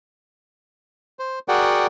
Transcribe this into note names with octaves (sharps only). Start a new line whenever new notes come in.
C5
F#4 G#4 A#4 D5 F#5 G5